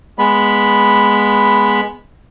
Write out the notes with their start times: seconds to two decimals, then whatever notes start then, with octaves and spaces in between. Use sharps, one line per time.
0.19 G#3 B3 B5